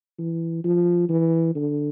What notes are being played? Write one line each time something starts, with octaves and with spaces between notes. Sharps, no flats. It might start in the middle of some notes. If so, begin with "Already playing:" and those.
E3
F3
E3
D3